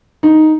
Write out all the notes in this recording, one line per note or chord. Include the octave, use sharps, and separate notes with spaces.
D#4